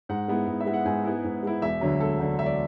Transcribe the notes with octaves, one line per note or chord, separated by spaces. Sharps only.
G#2 F#5
G#3 B3 E4
G#2
E5
G#3 B3 E4
F#5
G#2 G#5
G#3 B3 E4
G#2
G#3 B3 E4
E1 E5
D2 D3 F#3
E1 A4
D2 D3 F#3
E1 E5
D5